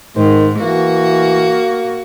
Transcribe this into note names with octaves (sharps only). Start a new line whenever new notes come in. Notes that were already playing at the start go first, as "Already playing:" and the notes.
G#2 D#3 C5
E3 A#3 F#4